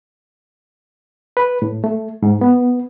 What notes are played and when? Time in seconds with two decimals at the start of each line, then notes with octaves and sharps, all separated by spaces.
1.37 B4
1.62 A2
1.84 A3
2.23 G#2
2.41 B3